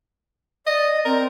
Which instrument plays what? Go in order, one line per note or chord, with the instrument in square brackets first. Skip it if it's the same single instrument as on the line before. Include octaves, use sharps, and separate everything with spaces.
[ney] D5 [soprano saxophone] D#5
[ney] C4 [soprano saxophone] A#4